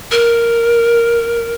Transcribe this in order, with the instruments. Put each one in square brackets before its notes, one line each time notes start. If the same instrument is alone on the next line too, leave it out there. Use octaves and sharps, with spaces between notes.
[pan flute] A#4